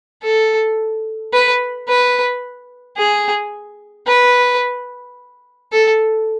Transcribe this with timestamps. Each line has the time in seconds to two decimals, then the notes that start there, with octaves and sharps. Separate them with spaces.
0.23 A4
1.33 B4
1.88 B4
2.97 G#4
4.07 B4
5.72 A4